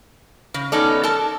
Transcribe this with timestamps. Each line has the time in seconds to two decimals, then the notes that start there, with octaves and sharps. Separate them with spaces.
0.54 C#3
0.72 B3 C#4 D#4 A4 D5
1.03 A4 A#4 A5